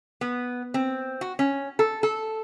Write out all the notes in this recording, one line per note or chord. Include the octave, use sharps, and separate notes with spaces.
B3
C4
F#4
C#4
A4
A4